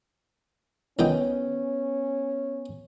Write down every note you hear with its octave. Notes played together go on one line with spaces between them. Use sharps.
C2 D#3 B3 C#4 G5